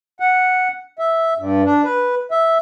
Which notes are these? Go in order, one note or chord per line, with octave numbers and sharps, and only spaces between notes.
F#5
E5
G2
D4
B4
E5